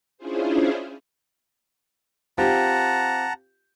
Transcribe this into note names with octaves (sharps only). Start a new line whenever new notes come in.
C#4 D4 E4 F4 G#4 C5
C4 F4 G4 F#5 A5 A#5